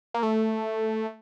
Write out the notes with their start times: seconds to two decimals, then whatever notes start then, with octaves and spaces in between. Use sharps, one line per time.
0.14 A#3
0.23 A3